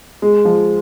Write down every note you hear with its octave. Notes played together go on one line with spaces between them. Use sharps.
G#3
F3